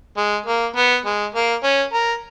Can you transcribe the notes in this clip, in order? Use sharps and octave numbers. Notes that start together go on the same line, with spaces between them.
G#3
A#3
B3
G#3
A#3
C#4
A#4